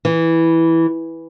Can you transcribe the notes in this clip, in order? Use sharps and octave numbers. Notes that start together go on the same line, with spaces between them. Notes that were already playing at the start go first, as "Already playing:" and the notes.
E3